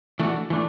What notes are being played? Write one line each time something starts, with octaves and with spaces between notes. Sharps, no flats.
E3 A3 D4 F#4
E3 A3 D4